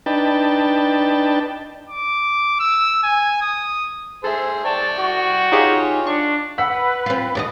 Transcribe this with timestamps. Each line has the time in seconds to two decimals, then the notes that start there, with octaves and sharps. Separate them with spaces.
0.06 D4 D#4 B4 G5 A5
1.89 D6
2.59 E6
3.03 G#5
3.41 D#6
4.24 G#4 A4 C5 E5
4.65 D5 G5 A5 C#6
5.00 F#4
5.52 D#4 F4 G4 G#4 C#5
6.07 D4 C#6
6.58 B4 F#5 E6 B6
7.06 C4 F4
7.35 D#2 D4 D#5